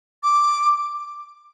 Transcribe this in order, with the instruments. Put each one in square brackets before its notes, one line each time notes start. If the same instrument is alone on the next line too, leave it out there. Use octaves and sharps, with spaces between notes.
[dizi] D6